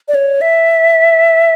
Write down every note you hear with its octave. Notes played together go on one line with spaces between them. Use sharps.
D5
C#5
E5